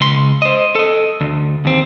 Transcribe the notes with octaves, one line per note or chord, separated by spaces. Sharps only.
C#2 C6
C5 D#5
A4 D#5
D2
D#2 C4